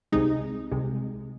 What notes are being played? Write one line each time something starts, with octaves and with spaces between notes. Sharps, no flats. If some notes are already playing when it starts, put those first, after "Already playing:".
C2 C3 G#3 D#4
C2 C3 G#3